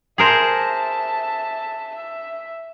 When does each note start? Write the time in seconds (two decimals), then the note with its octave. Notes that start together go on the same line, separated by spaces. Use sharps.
0.18 G#4 A#4 C5 E5 A5
1.95 E5